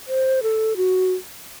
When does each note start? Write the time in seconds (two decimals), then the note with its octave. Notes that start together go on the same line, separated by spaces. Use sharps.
0.08 C5
0.43 A4
0.77 F#4